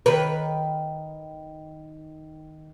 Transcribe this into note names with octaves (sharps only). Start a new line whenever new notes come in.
D#3 B4